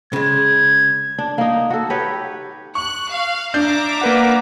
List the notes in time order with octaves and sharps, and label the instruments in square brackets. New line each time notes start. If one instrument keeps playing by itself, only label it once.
[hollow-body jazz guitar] C#3 G#3 [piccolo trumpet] G#6
[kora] D4
A#3 D#4
F#4 A4
G4 B4 C#5
[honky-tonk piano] C#6 [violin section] F#6
[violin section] F5
[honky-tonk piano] D4 [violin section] E5 A#5 D6 [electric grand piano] G6
[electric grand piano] A#3 B4 F#5